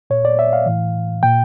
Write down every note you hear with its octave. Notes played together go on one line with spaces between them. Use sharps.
A#2 C#5
D5
E5
F5
A2 E3
A#2 G5